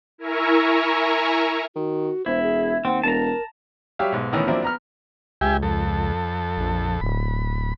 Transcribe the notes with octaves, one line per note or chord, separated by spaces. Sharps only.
E4 A#4 E5 G#5 A#5 C#6
D#3 F#4
E1 E4 C5
G#4
D#2 C4 F#5
E1 A#4 A5 A#5
F#3 G3 G4 C#5 E5 F5
B1 G#2
D2 A2 D#3 E3 B3 C#4
F3 F#3 A#3 C4 D4 E4
B3 A#5 F6
C#2 G4 E5 G#5
F2 A4
A#1
D1 B5